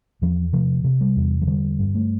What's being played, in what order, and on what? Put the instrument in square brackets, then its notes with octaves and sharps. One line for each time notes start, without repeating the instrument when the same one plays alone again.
[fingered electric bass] E2 F3
C3 F3
C3
G3
E2
F3
D3 G3
G2
A3